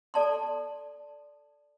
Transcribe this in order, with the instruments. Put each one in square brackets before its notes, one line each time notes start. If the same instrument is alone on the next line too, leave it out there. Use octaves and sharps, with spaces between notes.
[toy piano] A4 D5 A5 C6